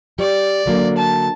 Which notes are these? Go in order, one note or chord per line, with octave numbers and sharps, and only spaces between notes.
G3 D5
D3 F#3 A#3
A5